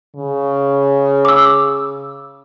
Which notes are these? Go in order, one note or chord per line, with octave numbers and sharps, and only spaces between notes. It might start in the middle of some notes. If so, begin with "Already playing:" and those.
C#3
D6 E6